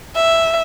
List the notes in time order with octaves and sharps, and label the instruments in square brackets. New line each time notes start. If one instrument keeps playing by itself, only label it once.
[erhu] E5